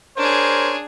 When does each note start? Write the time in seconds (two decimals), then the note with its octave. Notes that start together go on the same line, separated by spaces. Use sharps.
0.17 D4 G#4 A#4 C5 C#5